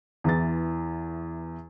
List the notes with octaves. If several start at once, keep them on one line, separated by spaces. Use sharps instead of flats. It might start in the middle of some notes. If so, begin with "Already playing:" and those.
E2 E3 A6